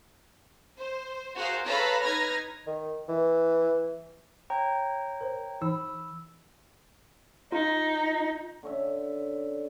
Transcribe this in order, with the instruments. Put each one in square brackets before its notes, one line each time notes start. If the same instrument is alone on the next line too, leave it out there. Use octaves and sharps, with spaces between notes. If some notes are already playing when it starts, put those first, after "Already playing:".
[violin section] C5
F#4 G#4 A#4 C5 F5
A4 B4 C#5 F5 A#5 B5
D#4 B4 F6 G#6 A#6
[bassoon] D#3
E3
[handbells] C#5 G5 A#5
[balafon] A#4 C5
[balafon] E3 D#4 [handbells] B5 E6
[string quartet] D#4 [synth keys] F4
[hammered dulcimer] D3 C#4 E5